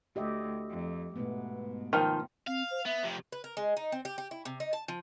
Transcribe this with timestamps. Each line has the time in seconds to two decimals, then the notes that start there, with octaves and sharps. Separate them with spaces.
0.16 D2 G4 D#5 E5
0.70 F2
1.16 G#2 B2 A3 B3
1.93 D#3 F3
2.47 C4 F5
2.71 C5
2.86 B3 E5
3.04 F2 C3
3.32 B4
3.44 A#4
3.57 G#3
3.77 D#4
3.92 C4
4.05 G4
4.18 G4
4.31 E4
4.45 C3
4.60 D#4
4.73 A5
4.88 F3